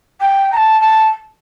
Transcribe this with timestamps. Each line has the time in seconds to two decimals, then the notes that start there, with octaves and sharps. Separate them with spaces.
0.20 G5
0.52 A#5
0.56 A5
0.81 A5